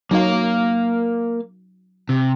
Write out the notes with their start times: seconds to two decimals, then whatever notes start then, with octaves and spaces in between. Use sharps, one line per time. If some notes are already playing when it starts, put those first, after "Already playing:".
0.11 F#3 A#3 D#4 F5
2.09 C3